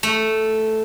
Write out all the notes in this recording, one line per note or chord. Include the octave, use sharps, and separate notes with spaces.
A3